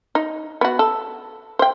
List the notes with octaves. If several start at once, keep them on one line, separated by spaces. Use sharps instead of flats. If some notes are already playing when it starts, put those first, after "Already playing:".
D#4
B3 F#4
A4
C5 G5